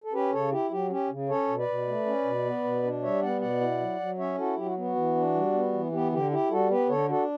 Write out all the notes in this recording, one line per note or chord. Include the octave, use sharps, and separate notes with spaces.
A4
C#4 G4 B4
C#3 A4 C#5
E4 G4
F#3 G4
C#4 G4
C#3
C#4 A4 C#5
B2
B4 D5
B2
A3
C#4
B2
B3
B2
D4
G3 C#5 E5
B3 D5 F#5
B2 D5 F#5
E4
F#3
F#3
C#4 C#5 E5
E4 F#4 A4
F#3 G4
F#4
B3
F#4
E3
D4
G3
B3
E3
B3 G4
D3 G4
E4 G4
G3 F#4 A4
B3 G4 B4
D3 A4 C#5
D4 F#4 A4